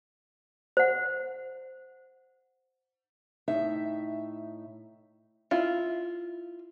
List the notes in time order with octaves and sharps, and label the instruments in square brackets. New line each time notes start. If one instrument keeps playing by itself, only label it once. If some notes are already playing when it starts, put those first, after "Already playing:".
[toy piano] C5 F#5
[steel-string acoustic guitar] A2 D#4 E5
[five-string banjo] E4 F4